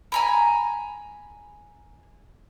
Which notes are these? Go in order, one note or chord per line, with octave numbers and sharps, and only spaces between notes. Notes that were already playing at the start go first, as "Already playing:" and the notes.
G#5 A#5 B5